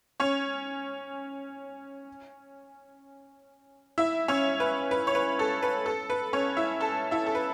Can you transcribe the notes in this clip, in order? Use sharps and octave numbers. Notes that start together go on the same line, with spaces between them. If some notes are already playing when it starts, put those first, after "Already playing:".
C#4 C#5
E4 E5
C#4 C#5
B4
B4
C#5
B4
A4
B4
A4
B4
C#4 C#5
E4 E5
A4 A5
E4 E5
A4
B4